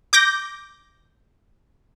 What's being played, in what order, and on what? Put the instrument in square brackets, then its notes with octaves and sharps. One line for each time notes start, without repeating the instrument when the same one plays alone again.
[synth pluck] D6 G6 A#6